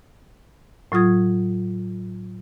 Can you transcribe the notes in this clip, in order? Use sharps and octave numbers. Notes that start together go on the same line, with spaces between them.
A2 F#3 F4 D#6 G#6